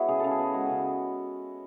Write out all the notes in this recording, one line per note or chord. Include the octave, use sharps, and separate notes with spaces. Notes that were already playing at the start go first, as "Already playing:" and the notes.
Already playing: G#3 B3 E4 F#4 C#5
C#3 G#4
C#3 A4
G#4
B3 F#4
G#3 F#4
C#3 G#4